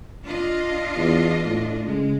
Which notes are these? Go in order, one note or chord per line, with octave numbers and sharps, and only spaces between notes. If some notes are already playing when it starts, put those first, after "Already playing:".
D4 F4 D#5
E2
A2
C#3 G#3